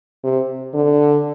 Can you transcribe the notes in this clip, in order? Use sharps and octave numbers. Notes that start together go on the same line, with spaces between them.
C3
D3